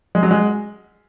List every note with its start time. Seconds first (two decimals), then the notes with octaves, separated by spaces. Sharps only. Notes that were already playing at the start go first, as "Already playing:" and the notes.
0.15 G#3
0.23 F#3
0.31 G#3